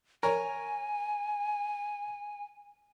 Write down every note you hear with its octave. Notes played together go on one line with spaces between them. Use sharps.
A#4 C#5 G#5